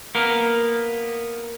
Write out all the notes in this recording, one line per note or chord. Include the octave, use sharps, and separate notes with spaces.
A#3 B3 A#4